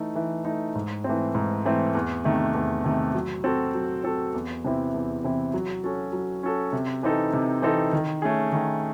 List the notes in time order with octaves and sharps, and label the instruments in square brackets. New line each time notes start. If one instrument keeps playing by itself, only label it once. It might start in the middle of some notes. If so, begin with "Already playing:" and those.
Already playing: [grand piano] E3 A3 D#4
E3
A3 D#4
G#2
E3 A3 C4
G#2
E3 A3 C4
E2
C3 D#3 A3
E2
C3 D#3 A3
F#3
C4 F#4 A4
F#3
C4 F#4 A4
E2
C3 E3 C4 E4
E2
C3 E3 C4 E4
F#3
C#4 F#4 A4
F#3
C#4 F#4 A4
C3
E3 C4 D#4 A4
C3
E3 C4 D#4 A4
D#3
A3 C#4 G#4
D#3